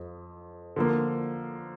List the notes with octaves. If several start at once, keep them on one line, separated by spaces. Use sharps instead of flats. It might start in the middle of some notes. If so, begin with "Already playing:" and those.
Already playing: F2 F3
D3 F3 A#3